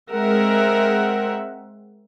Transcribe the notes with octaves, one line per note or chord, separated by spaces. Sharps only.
G#3 C4 A#4 E5 F#5